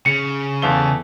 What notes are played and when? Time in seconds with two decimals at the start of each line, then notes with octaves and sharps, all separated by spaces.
0.06 C#3 C#7
0.62 E2 A3 F5 G7